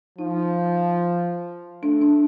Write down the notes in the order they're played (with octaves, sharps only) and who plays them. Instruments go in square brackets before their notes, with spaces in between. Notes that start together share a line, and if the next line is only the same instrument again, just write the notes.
[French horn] F3 [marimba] D#4
[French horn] A3 [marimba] D4
[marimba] D4